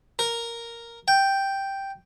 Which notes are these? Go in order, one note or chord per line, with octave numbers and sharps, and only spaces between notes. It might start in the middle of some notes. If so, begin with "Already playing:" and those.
A#4
G5